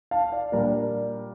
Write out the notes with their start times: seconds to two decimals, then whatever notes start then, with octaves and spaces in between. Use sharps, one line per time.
0.11 F5 A5
0.32 D5 F5
0.52 A#2 G3 A#3 D4 A#4 D5